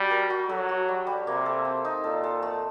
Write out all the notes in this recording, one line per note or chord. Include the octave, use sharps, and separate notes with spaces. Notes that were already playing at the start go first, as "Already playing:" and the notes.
Already playing: G3 D4 F#4
A#4
F#4
F#3 A4
F#4
G3
G3
C3 A#3
A4
C4
D#4
A#2 A4
A4
A3